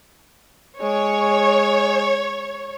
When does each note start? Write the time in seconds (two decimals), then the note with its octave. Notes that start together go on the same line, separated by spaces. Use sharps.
0.81 G#3 C#5